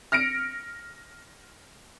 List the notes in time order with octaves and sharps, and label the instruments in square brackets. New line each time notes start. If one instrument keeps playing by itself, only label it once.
[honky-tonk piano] F6 A#6 C#7 D7